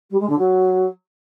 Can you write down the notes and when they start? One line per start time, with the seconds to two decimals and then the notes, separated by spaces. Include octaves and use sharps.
0.10 G3
0.19 G#3
0.29 D3
0.38 F#3